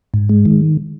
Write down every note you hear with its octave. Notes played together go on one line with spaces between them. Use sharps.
G#2
G#3
D#3